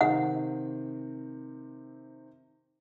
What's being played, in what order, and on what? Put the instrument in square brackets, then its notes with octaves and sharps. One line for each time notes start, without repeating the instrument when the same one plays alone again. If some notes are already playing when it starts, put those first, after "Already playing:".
[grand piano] C3 D#3 C4 [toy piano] F#5